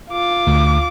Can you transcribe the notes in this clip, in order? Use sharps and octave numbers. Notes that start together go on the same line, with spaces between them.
F4 D6
D2